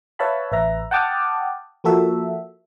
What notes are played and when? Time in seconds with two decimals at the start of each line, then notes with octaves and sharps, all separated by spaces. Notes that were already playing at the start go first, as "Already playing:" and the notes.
0.19 B4 C#5 E5 F5 A5 B5
0.52 A1 B4 E5 A#5
0.91 F#5 G5 A5 D6 D#6 F6
1.84 F3 A#3 F#4 A4 E5